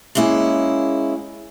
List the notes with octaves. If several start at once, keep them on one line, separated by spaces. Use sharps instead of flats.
G#3 A#3 C#4 E4 G#4